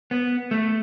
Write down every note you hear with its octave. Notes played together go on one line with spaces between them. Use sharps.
B3
A3